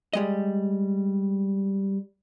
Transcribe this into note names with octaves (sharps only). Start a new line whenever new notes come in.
G3 G#3 D#5